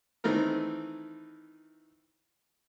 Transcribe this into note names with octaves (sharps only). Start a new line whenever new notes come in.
D#3 E3 A3 C4 D#4 A#4